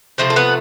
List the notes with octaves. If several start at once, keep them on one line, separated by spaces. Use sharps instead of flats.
C3 F3 A3 C4 C5
A4
B3 B4